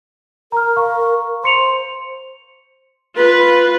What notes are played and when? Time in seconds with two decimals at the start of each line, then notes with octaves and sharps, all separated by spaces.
0.52 A#4 A#5 F6
0.76 F5 A#5 C#6
1.44 C5 C6 C#7 F7
3.15 F4 B4